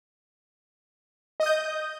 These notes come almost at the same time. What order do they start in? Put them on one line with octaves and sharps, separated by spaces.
D#5 D#6 G6